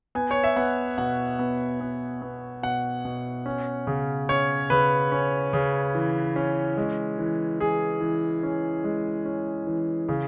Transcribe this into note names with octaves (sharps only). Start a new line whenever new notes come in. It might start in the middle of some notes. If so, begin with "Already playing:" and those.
B3 G#5
C#5
E5
B3 F#5
B2 F#5
B3
B3
B3
B2 F#5
B2
C#4
C#3
C#4 C#5
C#3 B4
C#4
C#3
E3
C#4
G#3
E3
E3 G#4
E3
C#4
G#3
C#4
E3
C#3